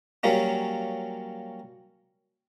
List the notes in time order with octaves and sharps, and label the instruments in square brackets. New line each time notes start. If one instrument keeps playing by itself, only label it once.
[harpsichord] F#3 G3 A#3 C#4